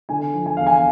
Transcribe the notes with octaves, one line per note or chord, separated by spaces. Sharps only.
D3 G#5
F3
G#5
E2 F5
G#5